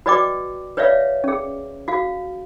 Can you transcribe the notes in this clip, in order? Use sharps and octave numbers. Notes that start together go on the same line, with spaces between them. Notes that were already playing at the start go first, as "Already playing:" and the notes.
F#4 B4 D5 D#5 G5 D6
B4 C#5 D5 E5 F5
C#4 G#4
F#4 F5